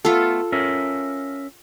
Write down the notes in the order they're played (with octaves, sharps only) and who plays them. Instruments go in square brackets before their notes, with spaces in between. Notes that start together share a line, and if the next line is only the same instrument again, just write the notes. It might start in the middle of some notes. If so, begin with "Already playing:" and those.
[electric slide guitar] A3 B3 [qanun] F4 A4
[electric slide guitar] C#4 A#4 E5